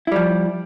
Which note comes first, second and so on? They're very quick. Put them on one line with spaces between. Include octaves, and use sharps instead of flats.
E4 G3 F3